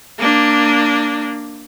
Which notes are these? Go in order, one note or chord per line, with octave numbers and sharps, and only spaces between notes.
A#3 D4